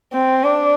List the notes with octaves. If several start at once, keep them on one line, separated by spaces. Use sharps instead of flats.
C4
D4